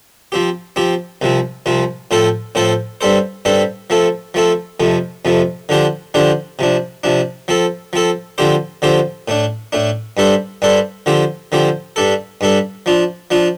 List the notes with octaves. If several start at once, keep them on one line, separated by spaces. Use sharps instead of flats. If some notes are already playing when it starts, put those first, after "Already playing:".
F3 C4 G4
F3 C4 G4
C2 C3 F3 C4
C2 C3 F3 C4
A2 F3 C4 A4 C5
A2 F3 C4 A4 C5
G2 G3 C4 A4 C5
G2 G3 C4 A4 C5
F3 A3 C4 A4
F3 A3 C4 A4
F2 C3 F3 A3
F2 C3 F3 A3
D3 F3 D4 G4 C5
D3 F3 D4 G4 C5
C3 F3 D4
C3 F3 D4
F3 C4 A4
F3 C4 A4
D3 F3 C4 G4 C5
D3 F3 C4 G4 C5
A2 A3 D4
A2 A3 D4
G2 G3 D4 A4 C5
G2 G3 D4 A4 C5
D3 F3 C4 G4 C5
D3 F3 C4 G4 C5
G2 G3 D4 A4
G2 G3 D4 A4
F3 D4 F4
F3 D4 F4